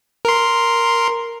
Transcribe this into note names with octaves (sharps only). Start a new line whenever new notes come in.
A#4 C6